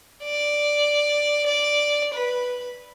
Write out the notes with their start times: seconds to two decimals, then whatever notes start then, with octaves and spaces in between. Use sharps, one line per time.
0.23 D5
1.46 D5
2.13 B4